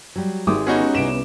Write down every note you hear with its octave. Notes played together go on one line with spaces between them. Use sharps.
F#3 G3
G#1 G#3 G4 E5 D6 D#6
B3 C#4 D#4 F#4 G#4 B4
C2 D7 E7